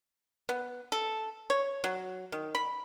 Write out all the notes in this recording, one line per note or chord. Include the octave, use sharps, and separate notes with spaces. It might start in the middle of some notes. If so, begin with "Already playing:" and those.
B3
A4
C#5
F#3
D#3
B5